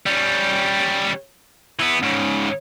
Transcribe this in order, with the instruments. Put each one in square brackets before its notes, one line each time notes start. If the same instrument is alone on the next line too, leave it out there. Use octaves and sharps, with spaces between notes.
[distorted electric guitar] G3 C#4
E3 B3
G#2 C#3